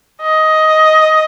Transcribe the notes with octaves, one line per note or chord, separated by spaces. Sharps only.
D#5